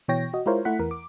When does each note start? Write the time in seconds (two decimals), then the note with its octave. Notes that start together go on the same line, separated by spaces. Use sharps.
0.08 B2 E3 C#5 G5 A#6
0.34 F#4 D#5
0.46 G#3 E4 F4 A#4 C5 C#5
0.65 A3 E4 F#5 B6
0.79 E2 E3 A#4
0.91 D6